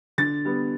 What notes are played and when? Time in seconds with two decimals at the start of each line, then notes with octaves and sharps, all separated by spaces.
0.18 D3 A6
0.45 G3 B3